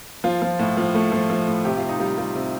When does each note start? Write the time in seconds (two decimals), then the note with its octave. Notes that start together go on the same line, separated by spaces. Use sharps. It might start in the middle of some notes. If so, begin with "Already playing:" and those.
0.24 F3 F4
0.42 F3
0.59 A2
0.77 F3
0.95 A3
1.12 F3
1.30 F3
1.48 A2
1.65 C3 G4
1.77 F4
1.83 C3
1.89 D#4
2.00 G3 F4
2.18 G3 F4
2.35 C3